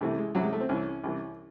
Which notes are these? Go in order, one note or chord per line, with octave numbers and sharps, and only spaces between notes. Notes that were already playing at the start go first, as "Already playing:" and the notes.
C2 C3 E3 A3
G#3
C2 C3 E3 F#3
G#3
A3
C4
C2 C3 E3 C#4
C2 C3 E3